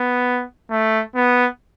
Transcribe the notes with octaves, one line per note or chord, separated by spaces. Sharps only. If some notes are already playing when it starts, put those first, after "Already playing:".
Already playing: B3
A3
B3